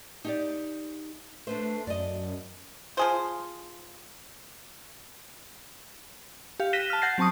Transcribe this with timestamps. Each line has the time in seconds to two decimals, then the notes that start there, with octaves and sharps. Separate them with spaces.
0.24 D#4 G4 D5
1.47 A3 D4 B4 C5
1.87 F#2 D5 D#5
2.97 F3 G#4 C5
6.60 G4 F5
6.73 F#6 A#6 B6 D#7 E7 G7
6.90 A5 F6
7.02 F#5 G6 A6 A#6 C7
7.18 F#3 C4 A5 C#6 D#6